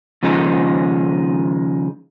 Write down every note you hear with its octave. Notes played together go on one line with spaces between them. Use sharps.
D#2 C#3 F3 G#3 D#4